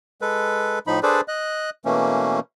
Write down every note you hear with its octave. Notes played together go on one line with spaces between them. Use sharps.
G#3 A4 B4
A2 F3 D#4 B5
D4 G#4 A4 B4 C5 D5
D#5 F#6
B2 E3 A3 A#3 C#4